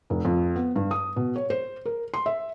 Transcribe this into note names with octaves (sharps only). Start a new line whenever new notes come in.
F1
F2
B3
G2
D#6
B2
C#5
C5
A#4
C6
E5